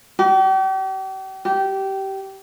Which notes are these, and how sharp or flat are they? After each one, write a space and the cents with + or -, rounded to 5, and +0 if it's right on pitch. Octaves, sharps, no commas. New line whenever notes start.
G4 -40
G4 -20